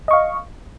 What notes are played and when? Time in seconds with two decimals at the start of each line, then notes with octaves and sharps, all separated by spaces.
0.08 D#5
0.11 C#6
0.13 F5